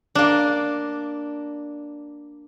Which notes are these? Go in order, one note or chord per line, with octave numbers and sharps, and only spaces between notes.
A#3 D4